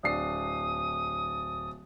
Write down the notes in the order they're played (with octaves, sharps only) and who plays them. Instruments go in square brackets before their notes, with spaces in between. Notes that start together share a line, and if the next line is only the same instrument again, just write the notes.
[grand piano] D1 D4 C7 [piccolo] D#6